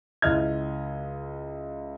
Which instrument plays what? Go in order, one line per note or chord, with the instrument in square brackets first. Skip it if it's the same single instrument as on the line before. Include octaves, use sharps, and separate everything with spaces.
[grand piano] C#2 E4 D#5 F6 G#6